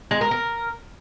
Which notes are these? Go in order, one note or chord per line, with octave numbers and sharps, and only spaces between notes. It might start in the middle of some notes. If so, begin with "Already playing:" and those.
G#3
A#4
A#4